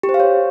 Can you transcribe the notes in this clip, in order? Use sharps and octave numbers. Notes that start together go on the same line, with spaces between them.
G4
C5
F5
C#5